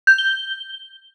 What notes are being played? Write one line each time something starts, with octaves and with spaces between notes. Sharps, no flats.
G6
G7